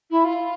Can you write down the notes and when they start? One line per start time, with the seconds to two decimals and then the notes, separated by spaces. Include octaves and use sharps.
0.11 E4
0.25 F4